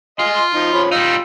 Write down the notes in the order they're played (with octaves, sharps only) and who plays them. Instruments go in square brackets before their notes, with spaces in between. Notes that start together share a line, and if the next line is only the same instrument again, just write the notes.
[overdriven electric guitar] F4 [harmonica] D#5 G#5 C6
[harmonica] F3 D#4
F3 C#4 B5
[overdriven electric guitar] G3 D#4 [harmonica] F4 E6